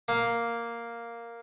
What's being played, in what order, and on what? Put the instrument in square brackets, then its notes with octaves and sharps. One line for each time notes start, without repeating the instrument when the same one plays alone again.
[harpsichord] A#3